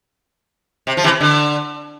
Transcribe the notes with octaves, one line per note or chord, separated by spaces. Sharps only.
C3
F3
C3 E3
D3